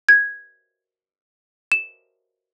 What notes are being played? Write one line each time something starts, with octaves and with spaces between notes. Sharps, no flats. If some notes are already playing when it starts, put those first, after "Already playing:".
G#6
E7